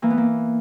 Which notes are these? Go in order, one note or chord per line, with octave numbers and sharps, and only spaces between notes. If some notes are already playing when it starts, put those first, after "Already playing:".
E3 A#3
B3
A#3